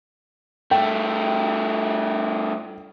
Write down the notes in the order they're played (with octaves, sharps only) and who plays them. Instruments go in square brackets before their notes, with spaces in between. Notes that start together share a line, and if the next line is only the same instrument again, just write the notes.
[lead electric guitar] G2 A3 [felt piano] G5